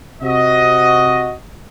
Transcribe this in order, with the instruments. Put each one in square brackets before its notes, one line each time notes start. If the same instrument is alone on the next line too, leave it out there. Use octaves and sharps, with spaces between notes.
[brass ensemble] C3 F#4 D#5